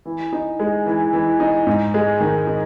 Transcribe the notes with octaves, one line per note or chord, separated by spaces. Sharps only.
E3
D#4
G#3
E3
E3
D#4
G#2
G#3
D#3
D#4